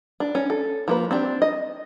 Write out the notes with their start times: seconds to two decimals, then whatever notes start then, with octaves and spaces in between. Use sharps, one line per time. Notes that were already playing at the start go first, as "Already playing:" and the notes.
0.20 D4
0.35 C#4
0.50 A4
0.88 F3 A#3 B4
1.11 C4 D4 G4
1.42 D#5